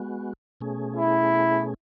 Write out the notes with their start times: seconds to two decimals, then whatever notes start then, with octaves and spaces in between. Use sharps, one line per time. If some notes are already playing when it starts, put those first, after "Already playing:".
Already playing: G#3 B3 F#4
0.61 B2 A3 C#4 G#4
0.96 E4